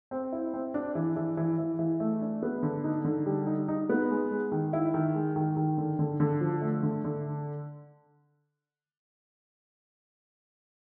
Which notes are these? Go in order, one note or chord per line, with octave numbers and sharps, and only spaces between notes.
C4
E4
C4
D4
E3
E3
E3
E3
E3
A3
D4
B3
D3
D#4
D3
G3
D#4
D#4
B3
G#3
G#3
D#3
E4
D#3
G#3
D#3
D#3
D3
D3
D3
F3
A3
D3
D3